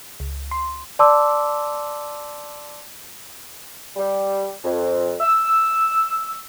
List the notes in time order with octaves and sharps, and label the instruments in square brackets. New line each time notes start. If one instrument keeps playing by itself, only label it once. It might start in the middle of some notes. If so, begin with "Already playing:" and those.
[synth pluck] C#2
C6
[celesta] D5 A5 C6 D6 E6
[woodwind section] G3
F2
E6